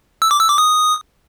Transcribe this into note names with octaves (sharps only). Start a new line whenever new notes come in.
E6
D6
E6
D6
D#6